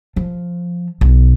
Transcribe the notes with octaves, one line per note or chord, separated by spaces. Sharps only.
F3
B1